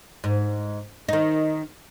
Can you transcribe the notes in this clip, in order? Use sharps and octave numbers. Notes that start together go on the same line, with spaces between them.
G#2
D#3 D#4